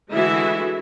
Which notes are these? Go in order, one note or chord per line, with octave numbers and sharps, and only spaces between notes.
D3 E3 G#3 E4 F#4 E5